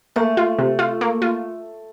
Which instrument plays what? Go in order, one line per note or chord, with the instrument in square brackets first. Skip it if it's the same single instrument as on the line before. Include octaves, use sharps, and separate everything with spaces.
[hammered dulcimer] A3 [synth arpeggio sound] A#3
[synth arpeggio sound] F4
C3
F4
A#3
F4